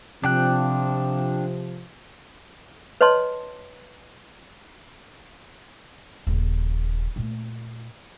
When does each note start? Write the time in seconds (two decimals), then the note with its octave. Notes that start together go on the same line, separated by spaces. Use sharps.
0.24 C3 F3 D4 G5 F#6
3.01 B4 C#5 D#5 A5 C6
6.27 D#1 C#3
7.16 A#2 A3